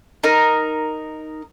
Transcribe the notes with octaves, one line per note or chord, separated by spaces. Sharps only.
D#4 A#4